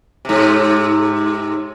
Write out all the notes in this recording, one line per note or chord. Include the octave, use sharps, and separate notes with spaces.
G#2 C3